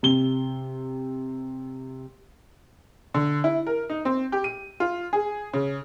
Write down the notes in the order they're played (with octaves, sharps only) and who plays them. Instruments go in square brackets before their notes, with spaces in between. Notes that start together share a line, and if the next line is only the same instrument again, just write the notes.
[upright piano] C3 G7
[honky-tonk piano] D3
E4
A#4
D#4
C4
G4
D#7
F4
G#4
C#3